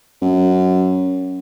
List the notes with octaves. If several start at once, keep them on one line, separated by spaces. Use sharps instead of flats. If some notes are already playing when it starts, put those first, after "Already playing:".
F#2